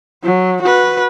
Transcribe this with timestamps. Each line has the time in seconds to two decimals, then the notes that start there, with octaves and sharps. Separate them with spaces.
0.24 F#3
0.62 F#4 B4